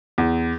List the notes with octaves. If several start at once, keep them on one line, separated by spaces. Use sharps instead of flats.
E2